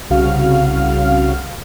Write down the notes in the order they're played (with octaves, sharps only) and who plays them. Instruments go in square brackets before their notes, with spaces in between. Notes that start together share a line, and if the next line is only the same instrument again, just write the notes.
[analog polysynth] C2 C#3 F#4 F5 F6